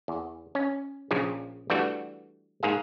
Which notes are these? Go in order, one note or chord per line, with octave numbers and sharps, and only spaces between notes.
E2
C#4
A#1 A#2 C#3 F3
E3 G3 A3 D4 F#4
G#2 A#3 G#4 F5